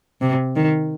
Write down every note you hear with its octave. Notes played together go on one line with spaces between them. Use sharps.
C3
D#3